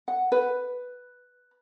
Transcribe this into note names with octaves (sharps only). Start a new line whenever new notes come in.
F#5
B4